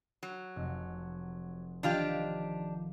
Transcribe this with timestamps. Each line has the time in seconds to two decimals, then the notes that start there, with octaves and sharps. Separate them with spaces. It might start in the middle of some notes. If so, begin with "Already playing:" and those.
0.23 F#3
0.56 F1
1.83 D#3 F3 D4 F4 G4 F5